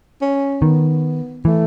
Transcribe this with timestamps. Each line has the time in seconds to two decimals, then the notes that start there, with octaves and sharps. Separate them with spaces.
0.21 C#4
0.62 D#3 B3
1.45 E3 A3